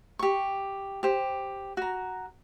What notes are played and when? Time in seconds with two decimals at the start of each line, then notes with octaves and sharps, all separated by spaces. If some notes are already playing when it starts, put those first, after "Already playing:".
0.19 G4 C#6
1.03 G4 C5
1.77 F#4 A#5